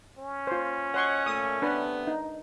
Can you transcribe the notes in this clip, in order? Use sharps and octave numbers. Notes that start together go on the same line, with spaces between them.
C#4
F4 C5
C#5 D#5 F#5 C6 C#6
A#2 A3 D#6
C3 A3 B3 D4 B4
D#4